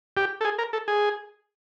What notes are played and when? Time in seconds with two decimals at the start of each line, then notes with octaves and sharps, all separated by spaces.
0.17 G4
0.41 A4
0.45 G#4
0.58 A#4
0.73 A4
0.88 G#4